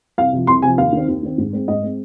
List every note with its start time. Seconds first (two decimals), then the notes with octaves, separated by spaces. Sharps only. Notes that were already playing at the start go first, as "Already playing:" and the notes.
0.18 C2 F5
0.33 C3 F3
0.47 C2 C6
0.62 C3 F3 G#5
0.78 D#2 F5
0.93 D#3 C4
1.08 D#2
1.23 D#3 C4
1.38 G#2
1.53 G#3 C4
1.68 G#2 D#5
1.83 G#3 C4